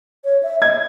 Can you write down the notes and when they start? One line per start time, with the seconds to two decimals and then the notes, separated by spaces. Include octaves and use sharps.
0.25 C#5
0.43 E5
0.61 D#5 G#6